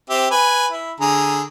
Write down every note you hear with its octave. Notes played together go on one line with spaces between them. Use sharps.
C4 G4 E5
B4 G#5
E4
D3 G#4 A#5